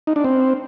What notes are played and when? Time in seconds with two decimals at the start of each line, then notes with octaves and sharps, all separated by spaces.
0.07 D#4
0.16 D4
0.25 C4